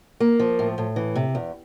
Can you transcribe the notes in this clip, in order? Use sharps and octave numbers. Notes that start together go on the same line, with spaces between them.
A#3
F3
A2
A2
E3
C3
E2